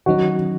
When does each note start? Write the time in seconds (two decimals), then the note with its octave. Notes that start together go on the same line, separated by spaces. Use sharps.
0.06 D#3 F#3 C#4 D#4 F#4